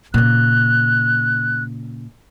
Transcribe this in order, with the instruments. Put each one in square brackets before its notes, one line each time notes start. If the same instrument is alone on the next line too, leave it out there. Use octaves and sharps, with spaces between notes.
[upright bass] A#2 C#3 [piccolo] F#6